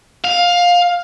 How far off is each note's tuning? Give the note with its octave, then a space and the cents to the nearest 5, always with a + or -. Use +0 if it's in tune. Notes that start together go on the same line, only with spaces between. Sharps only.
F5 +15